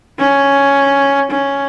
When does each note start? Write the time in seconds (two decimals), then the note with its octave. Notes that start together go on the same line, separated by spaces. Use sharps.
0.18 C#4
1.30 C#4